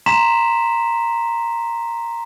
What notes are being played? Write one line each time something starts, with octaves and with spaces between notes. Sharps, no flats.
A#5 C6 B6 E7